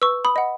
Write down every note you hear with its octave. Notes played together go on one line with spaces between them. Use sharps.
B4 C#6 E6
B5 D#6
D#5 F#5